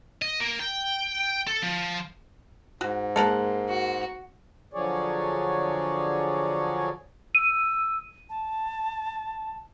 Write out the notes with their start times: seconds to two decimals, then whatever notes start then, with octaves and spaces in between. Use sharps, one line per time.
0.22 D#5
0.40 A#3
0.59 G5
1.47 A4
1.62 F3
2.81 G#2 F#4
3.16 G#3 A#3 A4 A#4 F#5
3.69 F#4
4.73 D3 F3 F#3 G#4 C#5 D5
7.35 E6 D#7
8.30 A5